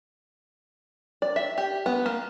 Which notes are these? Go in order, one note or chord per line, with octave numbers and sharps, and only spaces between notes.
D5
E5
G4
B3
A#3